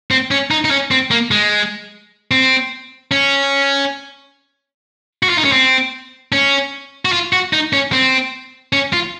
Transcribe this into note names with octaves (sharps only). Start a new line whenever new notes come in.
C4
C#4
D#4
D#4
C#4
C4
A#3
G#3
C4
C#4
F#4
F4
D#4
C#4
C4
C#4
F#4
F4
F#4
D#4
C#4
C4
C#4
F4